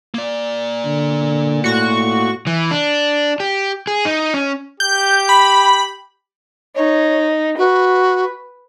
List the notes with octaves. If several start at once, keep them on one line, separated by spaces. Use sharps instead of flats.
A#3 D5
D3
A2 F#4 C#6
E3
D4
G4
G#4
D#4
C#4
G4 G6
B5
D#4 C#5
F#4 B4